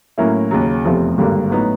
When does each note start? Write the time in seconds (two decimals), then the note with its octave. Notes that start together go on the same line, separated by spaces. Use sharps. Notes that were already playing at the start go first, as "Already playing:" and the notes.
0.18 A2 F#3 A#3 C#4 E4
0.51 D#2 C#3 F#3
0.85 F1 E2 C3 F3 A3
1.18 G#1 G2 D3 G3 A#3
1.50 A2 F#3 B3 D#4